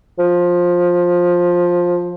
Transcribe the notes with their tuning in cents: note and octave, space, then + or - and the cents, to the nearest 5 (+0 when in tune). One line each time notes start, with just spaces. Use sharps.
F3 +15